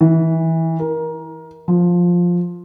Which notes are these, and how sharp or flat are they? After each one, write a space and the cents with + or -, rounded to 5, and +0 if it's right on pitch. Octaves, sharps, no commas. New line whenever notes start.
E3 -20
A#4 +20
F3 +10